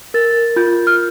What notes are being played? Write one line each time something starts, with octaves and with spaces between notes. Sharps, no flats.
A#4 A6
F4 G6
F6